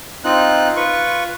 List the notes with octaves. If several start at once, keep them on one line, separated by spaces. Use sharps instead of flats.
C4 D#4 F4 F#6
F4 B4 C#6